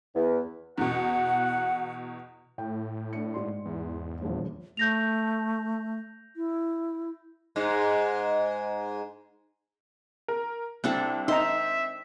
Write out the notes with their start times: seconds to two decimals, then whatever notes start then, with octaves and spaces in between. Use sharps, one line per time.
0.16 E2
0.78 E2 B2 F#5
2.58 A2 G5
3.13 D4 C#7
3.34 G#2 D5 C6
3.65 E2
4.22 D#1 A#1
4.77 A3 G6 A#6 F7
6.36 E4
7.56 G#2 G#3 D#4
10.28 A#4
10.84 C2 C4 D4 A4
11.28 C4 D#4 E5 A#5 C6